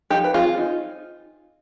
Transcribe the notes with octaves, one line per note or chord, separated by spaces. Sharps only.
F3 D#4 G4
B4
C4 F4 G#4
D#4